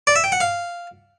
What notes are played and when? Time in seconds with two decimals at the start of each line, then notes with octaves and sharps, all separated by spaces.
0.07 D5
0.15 E5
0.24 G5
0.32 F#5
0.40 F5